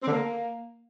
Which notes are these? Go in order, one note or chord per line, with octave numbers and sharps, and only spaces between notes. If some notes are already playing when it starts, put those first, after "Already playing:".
C4
D3
A#3